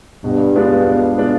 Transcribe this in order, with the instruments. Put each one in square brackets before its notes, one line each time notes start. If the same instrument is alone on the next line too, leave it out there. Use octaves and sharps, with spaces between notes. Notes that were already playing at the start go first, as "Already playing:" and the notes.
[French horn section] G2 [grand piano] B2
[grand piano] G#3 B3 D4 F4
B2
G#3 B3 D4 F4